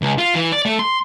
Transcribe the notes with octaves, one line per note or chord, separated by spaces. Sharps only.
C#2
F4
E3
D5
A3
C6